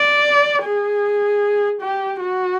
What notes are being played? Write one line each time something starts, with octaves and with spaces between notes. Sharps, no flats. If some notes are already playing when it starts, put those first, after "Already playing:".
Already playing: D5
G#4
G4
F#4